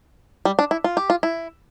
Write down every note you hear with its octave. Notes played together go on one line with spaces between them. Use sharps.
G3
D4
E4
F4
G4
F4
E4